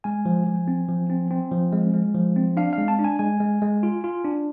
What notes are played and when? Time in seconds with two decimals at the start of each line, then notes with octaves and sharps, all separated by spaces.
0.04 G#3 G#5
0.25 F3
0.47 F3
0.68 C4
0.88 F3
1.10 C4
1.31 C4
1.51 F3
1.72 G#3
1.94 G#3
2.15 F3
2.36 C4
2.57 D4 F5
2.73 F5
2.78 G#3
2.88 A5
2.99 D4
3.04 G#5
3.19 G#3 G#5
3.40 G#3
3.62 G#3
3.83 F4
4.04 F4
4.25 D4